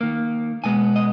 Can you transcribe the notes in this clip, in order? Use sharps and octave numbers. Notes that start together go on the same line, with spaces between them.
D#3 A#3
B2 G#3 B3 G#5
D#5